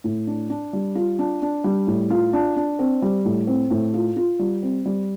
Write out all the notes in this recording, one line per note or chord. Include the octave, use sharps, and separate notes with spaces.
A2
D4
D4
G3
F4
D4
D4
G3
A2
F4
D4
D4
C4
G3
A2
C4
A2
F4
F4
G3
C4
G3